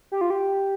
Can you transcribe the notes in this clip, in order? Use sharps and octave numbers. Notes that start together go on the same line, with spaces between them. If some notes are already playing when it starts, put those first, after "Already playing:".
G4
F4
G4